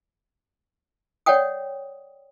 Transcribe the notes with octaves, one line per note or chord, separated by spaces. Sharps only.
C#5 D5 F#5 G5 D#6